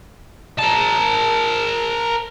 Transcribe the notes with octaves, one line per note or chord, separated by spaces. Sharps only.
A#4 A5